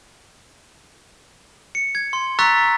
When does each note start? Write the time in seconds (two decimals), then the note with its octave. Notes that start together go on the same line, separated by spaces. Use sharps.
1.75 C#7
1.95 G#6
2.13 C6
2.39 A#5 C#6 E6 F#6 A6 B6